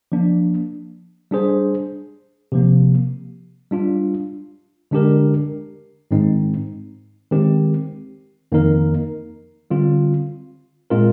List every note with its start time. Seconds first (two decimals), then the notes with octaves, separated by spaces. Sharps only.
0.12 F3 A#3 D4
1.31 G3 D4 G#4 C5
2.52 C3 F3 A#3
3.71 G3 D4 F4
4.91 D3 G#3 D4 G4 A#4
6.11 G#2 D#3 G#3 C4 D#4
7.31 D#3 G#3 C4 G4
8.52 F2 D#3 A#3 D#4 A#4
9.71 D3 G3 C4 F4
10.90 A#2 G#3 C4 F4 A#4